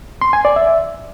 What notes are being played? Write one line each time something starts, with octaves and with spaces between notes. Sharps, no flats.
C6
G#5
D5
E5